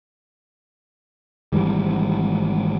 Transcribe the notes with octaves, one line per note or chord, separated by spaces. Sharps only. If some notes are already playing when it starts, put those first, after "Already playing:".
G#1 E3 G3